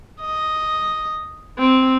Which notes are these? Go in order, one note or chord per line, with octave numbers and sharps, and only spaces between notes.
D#5
C4